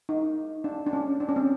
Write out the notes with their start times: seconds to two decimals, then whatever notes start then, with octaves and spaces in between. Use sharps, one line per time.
0.09 D#4
0.64 D4
0.87 D4
0.93 C#4
1.20 D4
1.29 C#4
1.36 C4